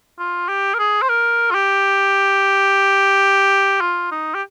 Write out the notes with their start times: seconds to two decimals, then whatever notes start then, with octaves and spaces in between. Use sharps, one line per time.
0.19 F4
0.49 G4
0.74 A#4
0.79 G#4
1.02 C5
1.09 A#4
1.51 F4
1.55 G4
3.81 F4
4.11 D#4
4.34 G4